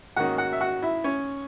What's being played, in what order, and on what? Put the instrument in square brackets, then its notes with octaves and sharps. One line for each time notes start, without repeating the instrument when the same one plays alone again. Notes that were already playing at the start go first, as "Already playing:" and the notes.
[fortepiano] G#2 D#3 A#3 C#4 F#4 F#5
F#4 F#5
E5
F#4 F#5
E4 E5
C#4 C#5